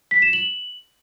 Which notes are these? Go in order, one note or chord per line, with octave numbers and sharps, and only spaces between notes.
B6
E7
F#7